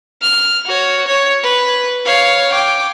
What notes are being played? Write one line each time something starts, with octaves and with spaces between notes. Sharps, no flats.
F6
F#4 C#5
C#5
B4
C#5 F5
G5 D6